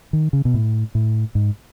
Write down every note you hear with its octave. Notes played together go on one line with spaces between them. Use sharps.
D#3
C#3
B2
A2
A2
G#2